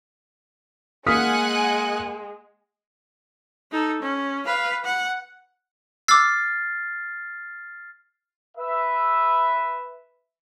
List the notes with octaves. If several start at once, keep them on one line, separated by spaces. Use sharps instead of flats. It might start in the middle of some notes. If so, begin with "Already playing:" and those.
G#3 A#3 F#5 G#5 D#6 F6 F#6 B6
D#4 A4
C#4
B4 F5
F#5
D6 E6 F6 A6 C7
B4 E5